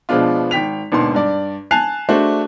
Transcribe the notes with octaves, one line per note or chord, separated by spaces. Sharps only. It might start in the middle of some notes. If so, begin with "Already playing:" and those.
B2 F3 G#3 B3 D4 F4
G#1 G5 B6 F7
G#1 D#2 B2 D3 C6
G2 D5
G#5 A5 F#6 C7 F7
G#3 A3 D4 F#4 C5